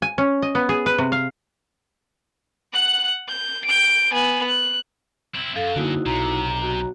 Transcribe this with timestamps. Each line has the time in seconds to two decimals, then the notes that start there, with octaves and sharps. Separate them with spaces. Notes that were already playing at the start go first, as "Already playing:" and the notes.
0.02 G#5
0.18 C#4
0.42 D#5
0.55 B3
0.69 G#4
0.86 B4
0.98 C3
1.12 F5
2.73 F#5 F#6
3.28 G6
3.65 G6 D7
4.13 B3 G#5
4.47 F#6
5.35 C4 E4
5.55 F#2 A4 F5
5.76 D3 A#3 D#4 E4 F#4
6.06 B1 C3 A#5
6.62 F#4